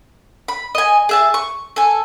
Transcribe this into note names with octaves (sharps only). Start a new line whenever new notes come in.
B5
D#5 G#5
G#4 E5 A5
C#6
A4 G#5